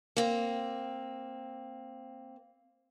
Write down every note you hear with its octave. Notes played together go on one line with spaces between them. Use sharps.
A#3 C4